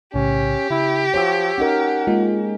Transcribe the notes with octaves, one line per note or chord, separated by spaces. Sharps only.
B1 A2 C#3 C#4 G4
C#3 E4
F3 F#4 C#5 G5 D6 E6
C#4 D#4 A#4 F#5
G#3 A#3 F4